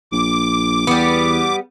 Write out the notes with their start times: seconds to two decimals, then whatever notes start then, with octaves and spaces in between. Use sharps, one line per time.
0.12 A#1 D6
0.87 E2 G3 B3